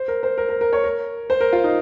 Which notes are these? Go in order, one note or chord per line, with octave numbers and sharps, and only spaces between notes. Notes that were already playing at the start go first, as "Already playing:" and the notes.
Already playing: C5
A#4
C5
A#4
A#4
A#4
C#5
A#4
C5
A#4
F4
D#4